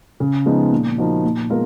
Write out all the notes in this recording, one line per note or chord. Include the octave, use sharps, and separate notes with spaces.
C#3
F3 G#3 B3 D#4
A#2
F3 A#3 D#4 F#4
A#2
G#3 B3 F4 A#4